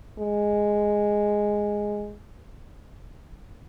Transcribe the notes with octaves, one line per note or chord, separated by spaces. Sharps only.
G#3